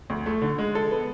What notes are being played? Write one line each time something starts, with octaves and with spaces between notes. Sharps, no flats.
D2
A3
D3
G#3
A4
B3